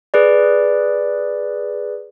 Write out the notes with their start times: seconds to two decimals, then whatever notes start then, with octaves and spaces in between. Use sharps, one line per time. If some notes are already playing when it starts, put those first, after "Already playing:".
0.14 G#4 B4 D5